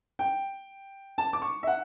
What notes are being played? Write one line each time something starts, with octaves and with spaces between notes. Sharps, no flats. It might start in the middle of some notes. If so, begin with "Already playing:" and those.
G5
A5
D6
C#6
E5
F#5